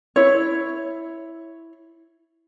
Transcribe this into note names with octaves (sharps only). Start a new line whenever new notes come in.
E4 C#5